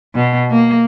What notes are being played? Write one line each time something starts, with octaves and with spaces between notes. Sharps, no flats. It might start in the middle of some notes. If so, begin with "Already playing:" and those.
B2
A#3